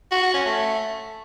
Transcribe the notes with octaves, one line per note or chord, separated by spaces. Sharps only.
F#4
F#4
C#4
A3